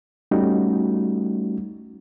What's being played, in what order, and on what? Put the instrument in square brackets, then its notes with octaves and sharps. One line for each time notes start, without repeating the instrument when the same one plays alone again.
[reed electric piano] G3 A3 C#4 D#4 F#4